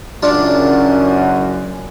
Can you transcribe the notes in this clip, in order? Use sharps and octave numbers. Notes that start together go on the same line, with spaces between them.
F#1 F#2 D4 F4 A5